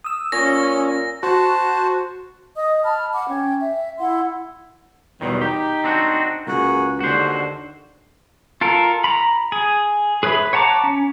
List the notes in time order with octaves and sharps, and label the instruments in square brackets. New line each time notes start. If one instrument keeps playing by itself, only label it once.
[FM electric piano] D#6 E6
[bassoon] A#2 [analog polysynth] C#4 [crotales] A#6
[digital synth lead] F#4 [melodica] C5 A5
[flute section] D#5 D#6
A5 B5 F6
F#5 D6
C#4 G5
E5
E4 F#5 C6
[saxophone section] E2 F#3 G3 [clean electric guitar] B2 D#3
[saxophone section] D#4 [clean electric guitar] G4
[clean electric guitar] C4 D4 F#4
[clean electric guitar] C#2 [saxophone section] A#3 F#4 G#4
[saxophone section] D#2 D3 D4 [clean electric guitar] F#4 C5
[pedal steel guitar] F4 A4 A#4
A#5 B5
G#4
G#4 B4 C#5 E5 B5
C#5 F#5 A5 A#5 D6
C#4